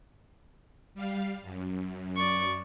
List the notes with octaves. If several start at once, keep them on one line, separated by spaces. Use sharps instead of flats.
G3 F5
F#2
D5 C#6